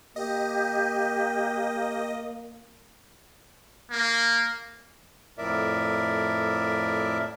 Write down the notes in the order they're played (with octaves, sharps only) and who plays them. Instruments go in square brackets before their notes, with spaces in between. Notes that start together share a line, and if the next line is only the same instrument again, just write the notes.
[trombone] A#3 [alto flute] G4 [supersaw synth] D#5
[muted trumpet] A#3
[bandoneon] F2 A2 A#4 D5 E5